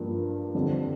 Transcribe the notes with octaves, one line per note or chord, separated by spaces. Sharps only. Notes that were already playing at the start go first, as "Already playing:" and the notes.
Already playing: G2 F3 A#3 D4
F2 D3 G3 C4